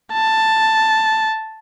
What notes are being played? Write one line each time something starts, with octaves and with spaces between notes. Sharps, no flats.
A5